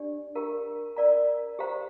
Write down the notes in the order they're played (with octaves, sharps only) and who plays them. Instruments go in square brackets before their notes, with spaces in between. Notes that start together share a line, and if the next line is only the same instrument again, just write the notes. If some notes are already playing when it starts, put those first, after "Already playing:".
Already playing: [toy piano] D4 G4 D5
G4 A#4 F5 A#5
A#4 D5 F5 A#5
G4 C5 F5 A#5